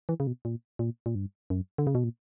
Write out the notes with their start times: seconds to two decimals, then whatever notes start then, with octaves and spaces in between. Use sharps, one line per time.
0.09 E3
0.20 C#3
0.27 B2
0.45 A#2
0.79 A#2
1.06 A#2
1.15 G2
1.50 F#2
1.78 D3
1.87 C#3
1.95 B2
2.04 A#2